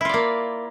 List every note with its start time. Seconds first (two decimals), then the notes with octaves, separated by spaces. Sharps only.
0.01 E4
0.05 F4
0.09 D5
0.14 A#3